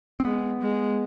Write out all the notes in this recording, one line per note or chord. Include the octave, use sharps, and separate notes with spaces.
C4
G#3 B3
G#3